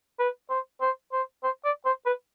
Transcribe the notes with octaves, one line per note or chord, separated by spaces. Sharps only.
B4
C5
C5
C5
C5
D5
C5
B4